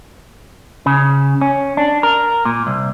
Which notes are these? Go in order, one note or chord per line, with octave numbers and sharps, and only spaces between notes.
C#3
C#4
D4
A#4
A#2
C2